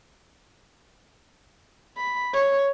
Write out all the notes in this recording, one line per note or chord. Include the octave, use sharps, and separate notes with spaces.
B5
C#5